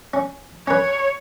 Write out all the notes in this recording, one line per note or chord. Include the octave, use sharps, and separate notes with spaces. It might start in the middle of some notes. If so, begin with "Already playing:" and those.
C#4
C#4 B4 C#5